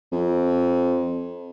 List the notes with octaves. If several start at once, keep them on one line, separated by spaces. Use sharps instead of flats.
F2